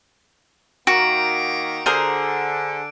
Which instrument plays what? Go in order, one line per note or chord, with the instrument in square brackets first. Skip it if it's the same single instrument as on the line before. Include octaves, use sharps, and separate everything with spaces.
[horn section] D#3 A#3 A#5 [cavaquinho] F#4 [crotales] D7
[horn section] D3 [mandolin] G#4 A#4 C5